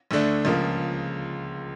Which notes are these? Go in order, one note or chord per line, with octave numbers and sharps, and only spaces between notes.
D2 D3 A3 D4
C#2 C#3 F3 A#3